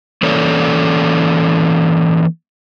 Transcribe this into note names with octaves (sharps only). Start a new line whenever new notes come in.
E3 A#3 C#4 A4 C#5 D5